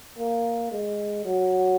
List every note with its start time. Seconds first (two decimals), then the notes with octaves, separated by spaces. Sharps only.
0.19 A#3
0.72 G#3
1.25 F#3